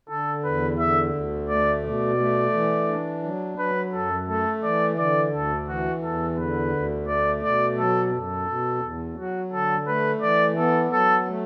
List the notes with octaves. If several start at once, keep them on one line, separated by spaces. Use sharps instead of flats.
D3 A4
E2 B4
D3 E5
D2
A3 D5
B2 D5
A3
E3
D4
F#3
F#3 B4
F#2 A4
A3 A4
E3 D5
D3 D5
D2 A4
E3 F#4
E2 A4
D3 B4
D2
A3 D5
B2 D5
F#3 A4
F#2 A4
B2
E2
F#3 F#4
D3 A4
A3 B4
E3 D5
B3 A4
F#3 A4
A3